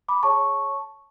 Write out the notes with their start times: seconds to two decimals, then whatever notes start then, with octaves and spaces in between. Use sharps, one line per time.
0.08 B5 D6
0.23 G#4 C#5 A5 C#6